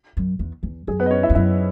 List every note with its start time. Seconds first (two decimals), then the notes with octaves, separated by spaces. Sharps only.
0.17 F#2
0.39 E2
0.63 E2
0.87 F#2 G#4
1.00 B3 B4
1.06 D#5
1.11 C#4 C#5
1.23 E4 E5
1.30 E2
1.35 F#2 E4 E5